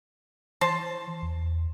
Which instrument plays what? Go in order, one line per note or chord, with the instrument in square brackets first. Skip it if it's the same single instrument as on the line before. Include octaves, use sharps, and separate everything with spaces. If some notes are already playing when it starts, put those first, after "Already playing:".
[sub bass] E3 [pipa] C5 A5
[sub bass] E2